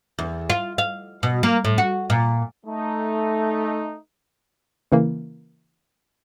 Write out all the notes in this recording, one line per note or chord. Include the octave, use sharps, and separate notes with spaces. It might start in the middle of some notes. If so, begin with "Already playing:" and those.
E2
F4
F5
B2
A#3
A2
F#4
A#2
A3 D#4
C#3 E3 A#3